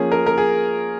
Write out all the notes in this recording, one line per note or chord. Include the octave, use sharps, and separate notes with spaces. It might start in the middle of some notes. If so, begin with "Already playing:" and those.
Already playing: F3 A#3 C#4 G#4
A#4
A#4
G#4